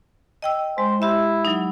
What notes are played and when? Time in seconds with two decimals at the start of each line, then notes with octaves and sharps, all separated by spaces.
0.42 D#5 G5 E6
0.78 G#3 C5
1.02 E4 G4 E5
1.45 F#3 D#4